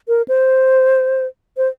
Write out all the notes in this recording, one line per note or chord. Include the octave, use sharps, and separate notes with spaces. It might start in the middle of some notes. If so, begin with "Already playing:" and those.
A#4
C5
C5